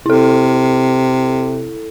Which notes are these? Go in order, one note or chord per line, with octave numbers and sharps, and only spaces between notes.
C3 E4 A4